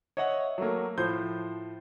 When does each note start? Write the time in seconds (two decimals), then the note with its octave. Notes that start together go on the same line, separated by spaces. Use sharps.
0.17 C#5 D#5 E5 F#5
0.58 F#3 A3 A#3
0.98 A2 F3 C5 G6